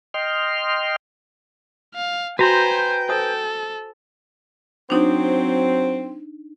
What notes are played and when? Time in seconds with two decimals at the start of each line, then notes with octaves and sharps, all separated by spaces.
0.14 D#5 G5 C6 F6
1.95 F5
2.39 F#4 B4 C5 G5 G#5 A#5 C6
3.09 A4 C5 G#5 D#6
4.90 F#3 C4 D4 D#4